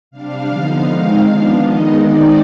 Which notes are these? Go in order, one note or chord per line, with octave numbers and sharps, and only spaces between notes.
C3 G3 D4 F5
D3 F3 B3 D#4
D#3 G#3 C4 D#4
F3 B3 D4 F5
D#3 G#3 B3 D#4 D#5
D#3 G#3 C4 D#4 D5